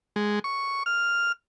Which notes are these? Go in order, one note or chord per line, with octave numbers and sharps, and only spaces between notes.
G#3
C#6
F6